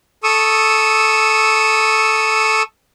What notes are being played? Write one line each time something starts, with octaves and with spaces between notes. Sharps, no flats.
A4 C#6 D#6 E6